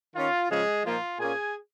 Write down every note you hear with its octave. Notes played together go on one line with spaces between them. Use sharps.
D#3 C#4 F4
C#3 F3 G#3 C#4 G#4
A#2 F3 A#3 D#4 F4
A#2 A#3 C#4 G#4 G#5